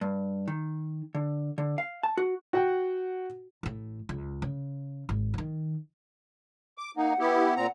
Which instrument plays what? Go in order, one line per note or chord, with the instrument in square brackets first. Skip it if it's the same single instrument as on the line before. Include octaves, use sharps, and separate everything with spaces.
[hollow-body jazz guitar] G2
D#3
D3
D3
F5
A5
F#4
[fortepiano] F#4 F#5 G5
[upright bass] A1 A2
C#2
C#3
G#1
D3 D#3
[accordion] D6
[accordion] A#3 D#4 [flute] F#5
[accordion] B3 E4 G4
A#2 C4 A#5